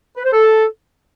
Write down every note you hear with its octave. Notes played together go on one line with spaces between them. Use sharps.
B4
C5
A4